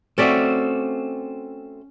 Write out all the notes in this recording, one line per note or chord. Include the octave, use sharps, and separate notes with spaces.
A3 C4 C#4 F#4 D5 E5